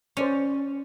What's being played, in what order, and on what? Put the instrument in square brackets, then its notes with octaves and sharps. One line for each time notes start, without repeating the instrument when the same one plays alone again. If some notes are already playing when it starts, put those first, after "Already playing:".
[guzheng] C#4 [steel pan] C5 D5 C#6